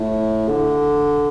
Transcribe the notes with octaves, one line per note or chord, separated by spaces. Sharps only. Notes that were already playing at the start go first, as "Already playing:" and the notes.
Already playing: A2
D3